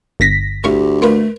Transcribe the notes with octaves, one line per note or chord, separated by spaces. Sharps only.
G1 A#6 B6
D2 A2 G4 F5 C#6
A3 A#3 F4 B4